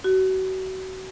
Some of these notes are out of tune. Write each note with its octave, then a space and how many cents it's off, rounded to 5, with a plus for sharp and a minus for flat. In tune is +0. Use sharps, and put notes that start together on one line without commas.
F#4 +30